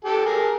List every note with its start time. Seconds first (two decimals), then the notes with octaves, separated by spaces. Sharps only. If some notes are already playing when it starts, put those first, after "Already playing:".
0.04 G4 A4
0.25 G#4 A#4